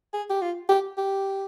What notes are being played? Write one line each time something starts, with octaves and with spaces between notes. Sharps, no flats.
G#4
G4
F4
G4
G4